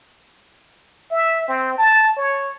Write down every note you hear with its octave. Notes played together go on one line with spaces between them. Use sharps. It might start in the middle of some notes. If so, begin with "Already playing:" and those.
E5
C4
A5
C#5